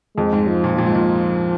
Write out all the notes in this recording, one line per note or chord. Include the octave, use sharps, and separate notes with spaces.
F2 G#3
G#2
F3
A#2
A#2 F3
G#2
A#2